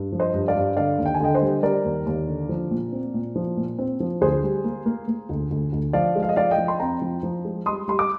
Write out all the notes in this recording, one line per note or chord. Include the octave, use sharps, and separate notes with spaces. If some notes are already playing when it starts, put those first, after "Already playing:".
Already playing: G2
F3
C5 D#5
G2
D5 F5
G2
D3 D5 F5
D#2
G5
G#5
D3 D#5 G5
C5 D#5
G3
G3 A#4 D5
D#2
D#2
D3
F3
A#2
C4
A#2
F3
A#2
C4
F3
D2 G#4 C5
G3
A#3
A#3
A#3
D2
D2
D2
F3 D5 F5
G#3
F5
D#5
F3 D5 F5
D#5 G5
F3
C6
F2 G5 A#5
F3
F3
G#3
G3 C6 D#6
G3 C6
D6